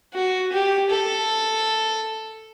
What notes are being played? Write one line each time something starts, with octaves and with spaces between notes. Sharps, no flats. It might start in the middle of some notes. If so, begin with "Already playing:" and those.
F#4
G4
A4